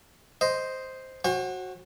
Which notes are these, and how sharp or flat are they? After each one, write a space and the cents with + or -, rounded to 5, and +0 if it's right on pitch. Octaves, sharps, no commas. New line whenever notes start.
C5 +0 D#5 +0
F#4 -5 C5 +40 G5 +40